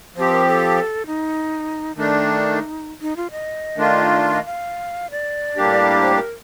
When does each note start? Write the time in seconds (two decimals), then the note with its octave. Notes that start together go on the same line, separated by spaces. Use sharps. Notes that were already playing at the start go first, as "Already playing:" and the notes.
0.16 F3 C4 G4 C5
0.32 A#4
0.47 A4
1.06 D#4
1.96 D#3 A3 D4 D#4
3.02 D#4
3.17 F4
3.31 D#5
3.76 D#3 A3 D4 F4
4.21 F5
4.33 D#5
4.45 F5
5.11 D5
5.57 A2 G3 A#3 D4 G4
6.01 C5
6.16 A#4